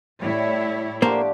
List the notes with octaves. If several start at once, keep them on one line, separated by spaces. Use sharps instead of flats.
A2 G3 E4 C#5
D3 F3 A3 A#3 G4 C5